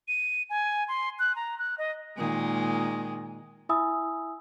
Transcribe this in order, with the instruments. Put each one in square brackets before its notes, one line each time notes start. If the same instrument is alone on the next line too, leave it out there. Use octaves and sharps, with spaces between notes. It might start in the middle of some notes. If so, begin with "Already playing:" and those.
[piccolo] D#7
G#5
C6
F#6
A#5
F#6
D#5
[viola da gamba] A#2 D#3 G#3
[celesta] E4 E5 G#5 B5 D#6 E6